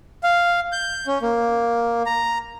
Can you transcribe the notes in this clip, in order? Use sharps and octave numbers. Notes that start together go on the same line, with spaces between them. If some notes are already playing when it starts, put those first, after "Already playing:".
F5
G6
C#4
A#3
A#5